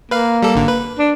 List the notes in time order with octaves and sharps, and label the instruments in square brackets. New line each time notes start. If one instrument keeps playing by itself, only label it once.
[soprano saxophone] A#3 [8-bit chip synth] B4 F5
[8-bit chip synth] G3 A4
G#1 D3
B4
[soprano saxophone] D4